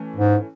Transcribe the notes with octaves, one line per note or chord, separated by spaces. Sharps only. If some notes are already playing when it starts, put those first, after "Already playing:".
Already playing: E3 A3 C#4
G#2